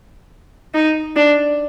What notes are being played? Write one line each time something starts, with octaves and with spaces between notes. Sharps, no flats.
D#4
D4